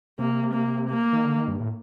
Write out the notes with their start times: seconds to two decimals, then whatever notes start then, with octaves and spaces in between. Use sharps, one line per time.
0.19 C3 A#3
0.54 A#3
0.89 A#3
1.13 D#3
1.25 D3
1.37 D#3
1.48 G2
1.60 A2